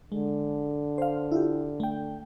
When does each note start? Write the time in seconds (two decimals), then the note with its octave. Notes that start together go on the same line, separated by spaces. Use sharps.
0.12 D3 G#3
0.98 C5 F5
1.32 E4 F4 G4
1.80 A3 G5